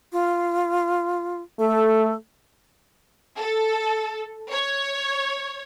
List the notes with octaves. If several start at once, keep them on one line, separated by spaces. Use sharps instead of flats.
F4
A3 A4
A4
C#5